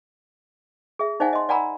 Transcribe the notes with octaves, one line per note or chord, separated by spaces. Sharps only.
G#4 E5
D#4 C5 D5 E5 F#5 G#5
D#5 C6
D5 F#5 G#5 A#5 B5 E6